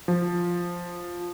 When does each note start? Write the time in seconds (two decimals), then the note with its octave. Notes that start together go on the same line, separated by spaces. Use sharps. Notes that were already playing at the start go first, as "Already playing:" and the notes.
0.08 F3